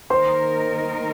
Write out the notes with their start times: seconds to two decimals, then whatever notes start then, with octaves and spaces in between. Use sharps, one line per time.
0.10 D#3 A#3 D#4 A#4 C5 C6